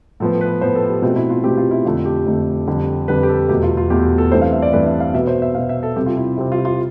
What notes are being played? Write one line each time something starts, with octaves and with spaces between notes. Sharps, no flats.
A2 F3 B3 A4
B4
A2 F3 B3 C5
A4
G4
B2 A3 C4 F4
E4
F4
B2 A3 C4 G4
F4
E4
F2 D3 A3 F4
G4
F2 D3 A3
F2 D3 G3
F2 D3 G3 B4
G4
A4
E2 B2 A3 G4
F4
F4
E2 B2 A3 G4
A4
G2 E3 A3 C4 C5
F5
E5
D5
G2 E3 A3 C4 B4
E5
F5
B2 B3 E5
C5
E5
B2 B3 F5
E5
A4
C3 G3 C4 G4
F4
E4
C3 G3 C4 E4
F4
F4